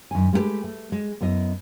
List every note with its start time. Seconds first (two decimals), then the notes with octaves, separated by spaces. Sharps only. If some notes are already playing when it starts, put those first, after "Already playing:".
0.11 F#2 D#3 G#5
0.33 G#3 A3 B3 G4 B4
0.64 A3
0.92 G#3
1.21 F#2 B3 E4 D#5